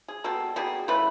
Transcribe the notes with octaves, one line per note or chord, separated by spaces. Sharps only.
G#4
B2 G3 A#3 A4
B2 G3 A#3 G#4
C#3 E3 A3 B4